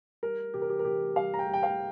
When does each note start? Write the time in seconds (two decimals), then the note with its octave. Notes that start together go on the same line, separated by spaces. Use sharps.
0.23 G3 A#4
0.54 C3 G4
0.62 A#4
0.70 G4
0.79 A#4
0.84 C3 G4
1.16 G3 F5
1.34 A#5
1.39 G5
1.47 G3
1.54 G5
1.63 F5